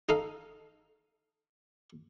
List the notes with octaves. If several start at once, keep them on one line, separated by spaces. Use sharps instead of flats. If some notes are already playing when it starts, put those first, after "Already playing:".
D#4 A4 F5